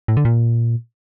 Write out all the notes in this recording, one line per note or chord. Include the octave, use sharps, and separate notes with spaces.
A2
D3
A#2